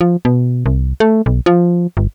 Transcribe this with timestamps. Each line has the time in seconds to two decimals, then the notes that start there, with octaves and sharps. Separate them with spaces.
0.01 F3
0.25 B2
0.66 C2
1.00 A3
1.26 B1
1.46 F3
1.97 G1